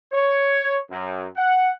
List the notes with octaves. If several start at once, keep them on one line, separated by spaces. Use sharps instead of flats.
C#5
F#2
F#5